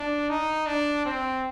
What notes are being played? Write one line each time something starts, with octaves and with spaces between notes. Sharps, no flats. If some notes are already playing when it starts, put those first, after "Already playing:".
Already playing: D4
D#4
D4
C4